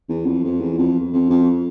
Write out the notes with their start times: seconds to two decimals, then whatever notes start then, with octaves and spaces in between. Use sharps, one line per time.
0.09 E2
0.26 F2
0.44 F2
0.60 E2
0.78 F2
1.13 F2
1.30 F2